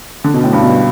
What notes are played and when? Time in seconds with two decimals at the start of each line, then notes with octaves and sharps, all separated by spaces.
0.24 D3
0.34 B2
0.44 A2
0.53 G2
0.63 B2